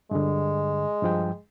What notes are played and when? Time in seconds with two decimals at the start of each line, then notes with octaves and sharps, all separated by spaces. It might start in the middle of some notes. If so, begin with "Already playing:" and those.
0.11 G2 D3 G#3
1.02 G2 F3 G5